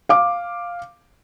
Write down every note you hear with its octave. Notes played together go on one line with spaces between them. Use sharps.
F5 D6